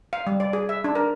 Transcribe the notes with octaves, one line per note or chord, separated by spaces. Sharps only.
F5
G3
D5
G#4
E5
D4
A#4